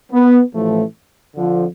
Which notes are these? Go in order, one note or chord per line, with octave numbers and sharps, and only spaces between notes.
B3
A1 A2 F3 A3
F2 D3 F3